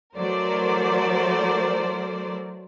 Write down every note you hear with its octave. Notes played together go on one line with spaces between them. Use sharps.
E3 F#3 A3 A#4 C5 D5